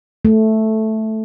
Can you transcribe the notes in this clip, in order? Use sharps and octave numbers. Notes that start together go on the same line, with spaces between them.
A3